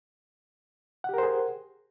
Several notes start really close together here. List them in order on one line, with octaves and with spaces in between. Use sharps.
F#5 G4 A#4 C5 G#4